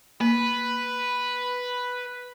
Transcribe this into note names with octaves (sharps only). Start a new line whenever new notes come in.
A#3 B4 B5